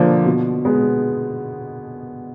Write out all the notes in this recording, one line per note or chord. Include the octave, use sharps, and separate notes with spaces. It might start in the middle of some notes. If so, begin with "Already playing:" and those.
Already playing: D3 F3 A#3 D4
B2
G#3 B3